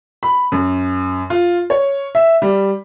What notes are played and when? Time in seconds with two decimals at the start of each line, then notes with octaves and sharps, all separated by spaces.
0.23 B5
0.52 F#2
1.30 F4
1.70 C#5
2.15 E5
2.42 G3